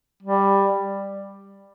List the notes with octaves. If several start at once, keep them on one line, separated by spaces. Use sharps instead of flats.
G3